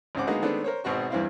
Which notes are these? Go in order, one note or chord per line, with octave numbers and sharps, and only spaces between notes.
G#1 C#2 C#3 C4 F#5 D6
D3 G#3 A#3 B3 D#4 F#4
D#3 G#3 A3 B3 C4 D4
A#4 C5 C#5
G#1 B2 C4 F#4 C#6
E2 G2 E3 C4 E4 F5